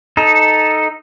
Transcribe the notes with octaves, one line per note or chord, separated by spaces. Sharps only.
D#4 A4